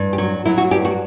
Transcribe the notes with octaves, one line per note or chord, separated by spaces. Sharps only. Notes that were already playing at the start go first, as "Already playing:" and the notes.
Already playing: G2
G4
F#3 F#4
F#3 E4
F#4
G2 G4
F#4